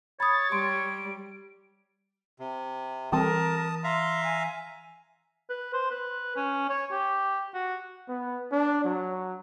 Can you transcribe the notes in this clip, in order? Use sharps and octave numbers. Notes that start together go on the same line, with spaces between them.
C#5 B5 D#6 A6
G3 C6 D7
C3
E3 G3 C4 A4 A#4 A5 D#6
E5 F5 A#5 C6
G#5
B4
C5
B4
C#4
C#5
G4
F#4
B3
D4
F#3